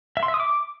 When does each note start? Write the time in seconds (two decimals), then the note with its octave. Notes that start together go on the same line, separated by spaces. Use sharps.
0.17 E5
0.23 C6
0.28 E5
0.34 D#6
0.40 D6